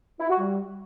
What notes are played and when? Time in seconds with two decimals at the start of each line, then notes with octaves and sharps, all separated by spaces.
0.20 E4
0.30 F#4
0.40 G3